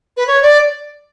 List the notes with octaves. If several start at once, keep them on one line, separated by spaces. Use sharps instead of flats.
B4
C#5
D5